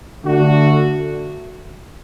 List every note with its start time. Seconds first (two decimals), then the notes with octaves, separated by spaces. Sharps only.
0.24 D3 A3 D4 F#4